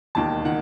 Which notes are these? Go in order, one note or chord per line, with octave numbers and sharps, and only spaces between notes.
E1 D#2 D#3 A5
D#3 F#5